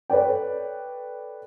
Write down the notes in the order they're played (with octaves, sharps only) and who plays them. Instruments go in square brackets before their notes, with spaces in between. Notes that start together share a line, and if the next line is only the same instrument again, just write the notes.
[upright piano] A4 B4 C#5 D5 G5